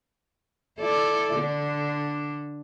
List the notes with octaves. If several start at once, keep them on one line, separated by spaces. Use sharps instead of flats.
E4 A4 D5
D3 D4